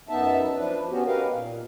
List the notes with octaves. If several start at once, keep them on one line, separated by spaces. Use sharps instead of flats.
F#2 B3 D#4 E5 A5
F3 D4 B4
B3 C#4 F#4 G4
D#4 G4 A#4 B4 F5
A#2